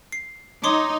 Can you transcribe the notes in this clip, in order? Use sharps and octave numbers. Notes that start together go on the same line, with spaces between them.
C7
D#4 C#5 C6 D6